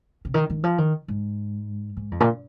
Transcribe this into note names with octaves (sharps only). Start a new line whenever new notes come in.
C3
D#3
D#3
F3
D#3
G#2
G#2
F2
A#2